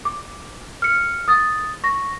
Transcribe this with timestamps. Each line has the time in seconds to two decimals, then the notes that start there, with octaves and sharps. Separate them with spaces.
0.05 D6
0.82 F6 C#7
1.28 D#6 A6
1.84 C#6 A#6